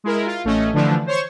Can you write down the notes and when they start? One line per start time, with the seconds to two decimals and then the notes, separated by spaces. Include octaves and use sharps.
0.04 G#3 E4 A#4
0.26 F4
0.44 A1 A3 C#4 D#5
0.73 D3 E3 F3 A3 D4
1.06 C5 C#5 C6 C#6